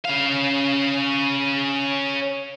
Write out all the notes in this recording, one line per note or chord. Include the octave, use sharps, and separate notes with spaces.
C#4 F5